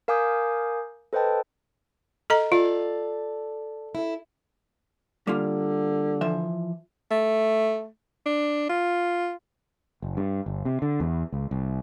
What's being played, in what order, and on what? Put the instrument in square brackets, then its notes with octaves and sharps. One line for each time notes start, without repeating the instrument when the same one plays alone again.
[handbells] A#4 F5 G#5 D6 D#6 G6
A4 B4 C5 D#5 G5 A5
[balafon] A4 D#5 A#5
[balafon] F4 [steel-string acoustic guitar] A4 D5 F5
[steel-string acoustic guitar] E4 A4
[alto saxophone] D3 [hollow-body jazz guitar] G3 A#3 F4
[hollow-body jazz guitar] E3 F3 E5
[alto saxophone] A3
D4
F4
[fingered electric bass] F#1
G2
G1
C3
D3
E2
C#2
C2